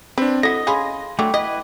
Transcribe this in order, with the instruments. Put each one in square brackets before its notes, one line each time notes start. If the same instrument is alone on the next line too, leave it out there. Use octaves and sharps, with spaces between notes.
[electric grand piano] C4 D4 [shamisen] B4
[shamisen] E4 F#4 [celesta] A4 B6 [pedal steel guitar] D#5 [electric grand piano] A#6
[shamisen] C#4 G#4 [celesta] F5 B5 C6
[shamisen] D3 F#3 [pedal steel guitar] A3 [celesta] F#5 G5 D6
[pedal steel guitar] E4 B4 [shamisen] D#5